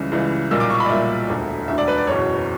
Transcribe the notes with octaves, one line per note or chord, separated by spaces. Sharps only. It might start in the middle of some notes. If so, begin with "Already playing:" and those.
Already playing: C#2 C#3 E3 G3
C#2 C#3 E3 G3
B1 A#2 G3 A#3 E6
D6
C#6
B5
D5
B1 A#2 G3 A#3 E5
E1 D2 D3
E1 D2 D3 E5
D5
B4
D5
F#1 E2 B2 C#5